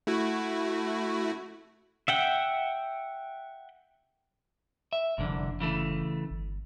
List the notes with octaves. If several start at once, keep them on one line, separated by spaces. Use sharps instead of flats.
A3 E4 F#4
E5 F#5 G5
E5
F#1 C2 F2 D3
C#3 E3 A3
G1